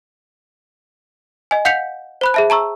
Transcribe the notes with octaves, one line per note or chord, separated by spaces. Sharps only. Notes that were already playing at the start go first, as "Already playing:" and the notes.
D#5 G#5
F5 F#5 G6 B6 C#7 F7
C5 B5 F#6
G#4 E5 A5
A5 A#5 C#6 E6